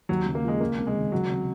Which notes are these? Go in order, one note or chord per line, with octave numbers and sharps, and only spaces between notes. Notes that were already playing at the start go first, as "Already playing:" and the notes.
D#2 F#3
C#3
A#3
F3 G#3
C#2 A#3
C3
G#3
D#3
C#2 F#3
C3